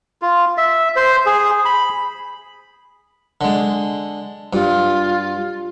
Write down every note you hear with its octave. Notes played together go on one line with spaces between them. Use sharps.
F4
E5
C5
G#4
B5
D3 G#3
G2 F4